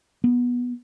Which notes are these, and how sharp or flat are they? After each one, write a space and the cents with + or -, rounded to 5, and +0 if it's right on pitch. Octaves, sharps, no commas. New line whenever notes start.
B3 -15